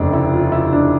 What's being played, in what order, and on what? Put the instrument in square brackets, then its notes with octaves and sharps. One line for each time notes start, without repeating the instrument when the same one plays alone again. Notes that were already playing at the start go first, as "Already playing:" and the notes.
Already playing: [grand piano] F1 D#2 C#3 D4 D#4
E4
F4
E4
D4